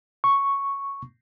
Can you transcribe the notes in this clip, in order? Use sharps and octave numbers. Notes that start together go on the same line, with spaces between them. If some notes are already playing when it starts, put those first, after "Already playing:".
C#6